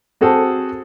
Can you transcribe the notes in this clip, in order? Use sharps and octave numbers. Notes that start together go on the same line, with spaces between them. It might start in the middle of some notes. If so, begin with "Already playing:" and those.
C4 F#4 G#4 A4 C5